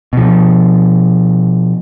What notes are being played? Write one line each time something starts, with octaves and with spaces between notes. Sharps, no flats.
B2 F3